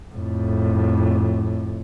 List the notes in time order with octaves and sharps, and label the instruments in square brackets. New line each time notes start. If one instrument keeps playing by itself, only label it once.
[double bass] F2 A2